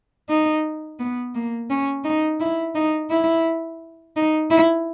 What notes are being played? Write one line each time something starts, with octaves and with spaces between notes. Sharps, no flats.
D#4
B3
A#3
C#4
D#4
E4
D#4
E4
D#4
E4